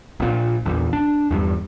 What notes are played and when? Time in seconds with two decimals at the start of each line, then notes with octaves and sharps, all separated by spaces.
0.20 A#1 A#2
0.66 A#1 E2
0.93 D4
1.31 E2 G2